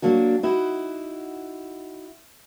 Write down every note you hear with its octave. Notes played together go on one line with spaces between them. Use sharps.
F#3 A#3 D4 F#4
D#4 E4 F#4